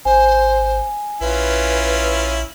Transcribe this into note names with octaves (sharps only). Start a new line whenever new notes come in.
G#1 C5 G#5
A#1 C#4 E4 F4 B4